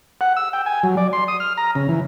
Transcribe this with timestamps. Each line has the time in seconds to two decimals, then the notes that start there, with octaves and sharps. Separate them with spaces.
0.21 F#5
0.37 E6
0.53 G5
0.66 G#5
0.84 F#3
0.97 D5
1.13 C6
1.28 D#6
1.40 F6
1.57 A#5
1.75 C#3
1.89 E3